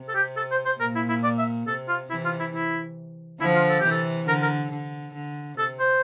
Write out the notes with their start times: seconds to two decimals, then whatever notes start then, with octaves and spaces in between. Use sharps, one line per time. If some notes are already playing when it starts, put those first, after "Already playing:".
Already playing: C3
0.09 A4
0.15 G4
0.37 A4
0.51 C5
0.66 C5
0.80 A#2 A#4
0.95 E4
1.09 E4
1.24 D5
1.39 E5
1.67 C3 A4
1.88 F4
2.10 C3 E3 E4
2.25 F4
2.39 E4
2.54 E4
3.40 D3 F3 E4
3.55 F4
3.70 A4
3.80 C3 E3 G4
3.91 A4
4.27 D3 A#4
4.42 A#4
4.71 D3
5.15 D3
5.58 C3 A4
5.79 C5